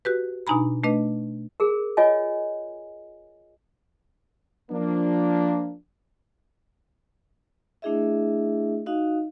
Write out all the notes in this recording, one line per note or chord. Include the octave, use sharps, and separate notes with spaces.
F#4 G4 B4
B2 D4 D#4 G#5 A#5 B5
A3 D4 B4 D#5
G#4 A#4
F4 C#5 D#5 G#5
F3 A#3 D4
A3 D4 E4 G#4 D#5 E5
D#4 F#4 D#5 F5